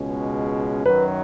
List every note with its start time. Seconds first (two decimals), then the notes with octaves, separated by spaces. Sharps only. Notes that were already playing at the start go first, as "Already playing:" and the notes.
Already playing: C#2 B2 G#3 C#4
0.86 F#2 D#3 F#3 B4